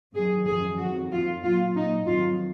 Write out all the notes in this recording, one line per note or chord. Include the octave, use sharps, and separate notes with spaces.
F#2 D#3 F#3 G#4
F#2 F3 G#4
F2 D#3 F#3 F#4
F2 F3 F4
A#2 F#3 F4
A#2 F#3 D#4
F2 D#3 F#3 F4